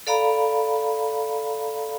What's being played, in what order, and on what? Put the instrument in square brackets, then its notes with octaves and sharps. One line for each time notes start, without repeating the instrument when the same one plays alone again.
[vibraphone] A4 D5 F5 A#5 B5